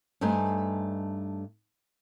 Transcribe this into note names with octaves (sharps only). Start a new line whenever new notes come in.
G2 A3 D#4 C5 G#5